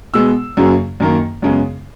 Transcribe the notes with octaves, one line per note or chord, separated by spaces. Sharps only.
B2 G#3 B3 E6
F#2 C#3 F#3 A#3
F#2 D#3 A#3
F#2 C#3 G#3 B3